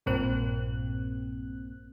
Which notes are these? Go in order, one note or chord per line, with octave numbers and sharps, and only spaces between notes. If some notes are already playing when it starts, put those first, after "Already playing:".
A#1 G2 A#2 A#3 C4 F#6